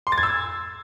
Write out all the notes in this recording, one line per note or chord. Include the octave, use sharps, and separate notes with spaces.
C6
A6
G#6
E6